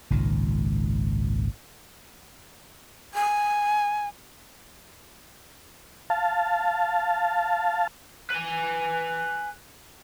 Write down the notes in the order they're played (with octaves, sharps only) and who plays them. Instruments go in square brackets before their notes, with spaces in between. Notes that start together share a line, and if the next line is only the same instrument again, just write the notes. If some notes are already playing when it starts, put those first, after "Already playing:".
[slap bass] G#1 C#2 A#2 D#3
[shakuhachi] G#5
[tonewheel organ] F5 A5
[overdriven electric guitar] B4 G#5